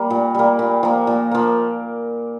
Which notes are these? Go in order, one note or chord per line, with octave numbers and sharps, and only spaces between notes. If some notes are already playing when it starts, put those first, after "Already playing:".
Already playing: G3 A#3
A#2
G3 A#3
A#2
F3 A#3
A#2
F3 A#3